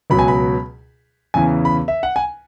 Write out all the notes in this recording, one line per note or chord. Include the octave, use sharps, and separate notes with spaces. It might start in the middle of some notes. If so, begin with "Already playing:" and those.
C#2 B2 F#3 B5
G#5
B5
E2 C#3 E3 G#5
B5
E5
F#5
G#5